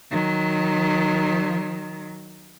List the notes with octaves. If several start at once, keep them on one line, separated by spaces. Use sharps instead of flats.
D#3 F#3